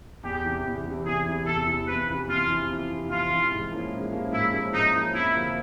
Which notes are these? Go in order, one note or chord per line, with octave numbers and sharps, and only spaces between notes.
E2 G4
C3 E3
E2
C3 E3
E2 G#4
C3 E3
E2 A4
C3 E3
F2 B4
C3 E3
F2 F4
C3 E3
F2
C3 E3
F2 F4
C3 E3
G#2
F3 A#3 C#4 E4
G#2
F3 A#3 C#4 E4
G#2 E4
F3 A#3 C#4 E4
G#2 D#4
F3 A#3 C#4 E4
F2 E4
D3 F3 A#3